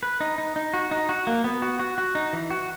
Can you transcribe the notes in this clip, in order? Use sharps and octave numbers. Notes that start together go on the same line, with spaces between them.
B4
D#4
D#4
D#4
F#4
D#4
F#4
A#3
B3
F#4
F#4
F#4
D#4
E3
F#4